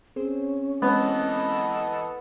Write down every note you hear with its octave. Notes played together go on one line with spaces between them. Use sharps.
C4 C#4 G#4 C5
E3 G#3 B3 C4 A4 D#5